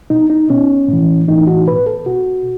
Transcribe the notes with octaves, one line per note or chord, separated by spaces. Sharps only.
B2 D#4
D#4
B2 C#4
A2 E3
A2 E3 D#4
F#4
B2 B4
A4
B2 F#4